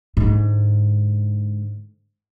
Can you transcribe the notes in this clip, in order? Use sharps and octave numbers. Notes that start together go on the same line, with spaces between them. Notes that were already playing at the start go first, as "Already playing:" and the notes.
G#2 D3